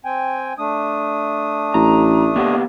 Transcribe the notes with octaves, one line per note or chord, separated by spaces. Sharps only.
C4 G5 G#5
A3 D4 D#6
A1 A#5
A#3 B3 G4